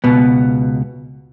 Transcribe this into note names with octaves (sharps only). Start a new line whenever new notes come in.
C#2 B2 B3